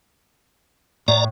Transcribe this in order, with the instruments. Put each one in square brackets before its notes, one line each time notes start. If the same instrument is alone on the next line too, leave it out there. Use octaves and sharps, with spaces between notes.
[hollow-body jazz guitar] A2 [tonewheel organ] D5 A#5